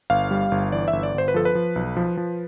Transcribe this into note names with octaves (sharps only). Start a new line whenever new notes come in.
G1 F5
G3
G1
E3 D5
E5
G1
D5
G1 C5
B4
F3 A4
B4
F3
B1
F3
F3